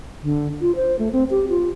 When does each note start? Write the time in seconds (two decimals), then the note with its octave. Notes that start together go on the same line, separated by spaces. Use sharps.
0.23 D3
0.61 F4
0.76 C5
0.99 A3
1.13 C4
1.31 G4
1.50 F4